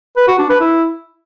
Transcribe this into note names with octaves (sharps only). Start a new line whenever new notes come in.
B4
F#4
D4
B4
E4